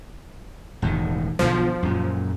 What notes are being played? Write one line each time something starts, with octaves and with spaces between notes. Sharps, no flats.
E1 A2 D#3
B1 B2 D3 F3
F#2 A#2